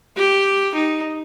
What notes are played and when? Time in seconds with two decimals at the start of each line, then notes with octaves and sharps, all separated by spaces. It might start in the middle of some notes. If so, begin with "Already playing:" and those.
0.16 G4
0.75 D#4